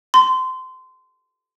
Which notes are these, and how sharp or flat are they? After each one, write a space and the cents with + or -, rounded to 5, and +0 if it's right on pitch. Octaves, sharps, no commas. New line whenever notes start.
C6 -25